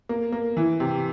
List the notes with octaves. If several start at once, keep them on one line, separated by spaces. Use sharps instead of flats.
A#3
A#3
E3
C3